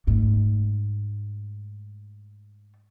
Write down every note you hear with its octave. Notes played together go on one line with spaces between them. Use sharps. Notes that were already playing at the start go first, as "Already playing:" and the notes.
G#2 A3